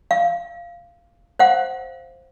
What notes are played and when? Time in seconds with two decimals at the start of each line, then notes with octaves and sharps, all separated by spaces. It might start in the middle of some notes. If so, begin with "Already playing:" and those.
0.11 F5
1.39 C5 F5 F#5